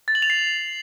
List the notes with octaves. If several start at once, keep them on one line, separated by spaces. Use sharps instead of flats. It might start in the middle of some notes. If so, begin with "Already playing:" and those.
A6
F#7
F7
C7